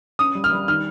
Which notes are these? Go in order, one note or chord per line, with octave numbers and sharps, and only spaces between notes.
C#4 D#6
G3
F6
G3
D#3 F6